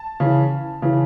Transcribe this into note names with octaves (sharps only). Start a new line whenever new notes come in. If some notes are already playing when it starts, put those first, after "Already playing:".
Already playing: A5
C#3 E3
C#3 E3